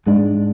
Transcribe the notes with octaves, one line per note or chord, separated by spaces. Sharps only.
G#2 G#3 D4